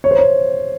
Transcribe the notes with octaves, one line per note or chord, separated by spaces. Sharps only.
C#5
C5
C#5